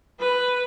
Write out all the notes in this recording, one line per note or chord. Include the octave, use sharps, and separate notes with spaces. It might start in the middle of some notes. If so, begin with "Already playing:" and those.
B4